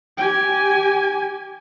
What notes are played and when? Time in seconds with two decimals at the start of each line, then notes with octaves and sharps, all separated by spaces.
0.18 G4 G#5